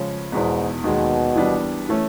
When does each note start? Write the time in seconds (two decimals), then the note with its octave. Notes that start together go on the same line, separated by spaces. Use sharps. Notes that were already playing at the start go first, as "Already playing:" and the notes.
Already playing: C#3 F3 G#3 C#4
0.32 E2 G#2 B2 G#3 B3 D#4
0.84 D#2 B2 D#3 G#3 B3
1.36 E3 G3 B3 D4
1.89 E3 A3 C#4